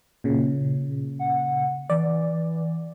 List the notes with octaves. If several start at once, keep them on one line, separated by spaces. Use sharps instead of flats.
A#2 C#3
F#5
E3 D5